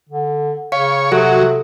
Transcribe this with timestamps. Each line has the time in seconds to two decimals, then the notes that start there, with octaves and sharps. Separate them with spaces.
0.09 D3
0.72 C#3 C#5 F5
1.12 C3 F#3 F#4 A4